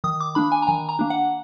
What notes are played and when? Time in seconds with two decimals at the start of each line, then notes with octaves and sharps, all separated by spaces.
0.04 D#3 D#6
0.20 D6
0.35 A#3 D4 B5
0.52 G#5
0.62 A#5
0.67 D#3 G#5
0.89 A#5
0.99 A#3 D4
1.10 F#5